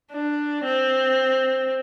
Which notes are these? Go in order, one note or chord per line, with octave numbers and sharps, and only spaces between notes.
D4
C4